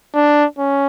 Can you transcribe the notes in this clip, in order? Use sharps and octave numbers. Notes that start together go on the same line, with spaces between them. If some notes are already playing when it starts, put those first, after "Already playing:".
D4
C#4